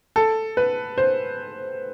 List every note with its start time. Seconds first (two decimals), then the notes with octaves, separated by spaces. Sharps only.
0.16 A4
0.57 B4
0.98 C5